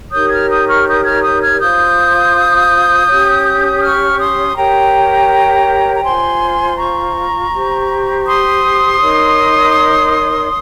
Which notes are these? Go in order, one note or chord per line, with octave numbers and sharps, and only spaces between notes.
D#4 G4 A#4 C#5 D#6 G6
F6 G#6
D#6 G6
C#6 F6
D#6 G6
F6 G#6
D#6 G6
F6 G#6
F4 C5 D#6 G6
C#4 G4 C#5
C#6 F6
C6 D#6
G4 A#4 C#5 G5 A#5
A#5
F4 C5 G#5 C6
A#5 C#6
G4 C5
C6 D#6
D#4 A#4 C#5